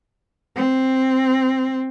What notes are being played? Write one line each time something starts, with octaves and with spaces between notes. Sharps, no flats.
C4